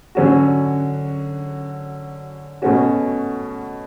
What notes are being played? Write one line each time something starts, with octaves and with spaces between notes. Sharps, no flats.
D3 F#3 C#4 F#4
B2 A3 C#4 F#4